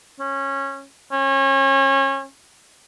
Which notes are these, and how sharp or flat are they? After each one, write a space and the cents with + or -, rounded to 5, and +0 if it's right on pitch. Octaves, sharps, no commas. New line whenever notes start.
C#4 -15
C#4 -30